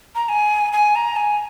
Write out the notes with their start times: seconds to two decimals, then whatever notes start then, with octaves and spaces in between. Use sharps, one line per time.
0.15 A#5
0.29 G#5
0.73 G#5
0.95 A#5
1.16 G#5